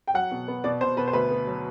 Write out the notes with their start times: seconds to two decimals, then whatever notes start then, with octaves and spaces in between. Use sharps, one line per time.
0.08 G5
0.14 F#3 F#5
0.31 B2
0.48 B3
0.64 B2 D5
0.81 B2 C5
0.97 B2 B4
1.08 C5
1.13 D2 B4
1.31 B3
1.47 F#3